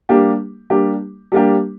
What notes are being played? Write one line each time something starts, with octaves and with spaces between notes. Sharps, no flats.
G3 A#3 D4 G4
G3 A#3 D4 G4
G3 A#3 D4 G4